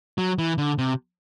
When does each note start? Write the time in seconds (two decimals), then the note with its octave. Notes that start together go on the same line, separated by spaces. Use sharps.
0.18 F#3
0.38 E3
0.58 D3
0.78 C3